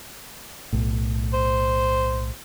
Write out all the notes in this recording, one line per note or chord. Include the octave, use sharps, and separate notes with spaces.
B1 A2
C5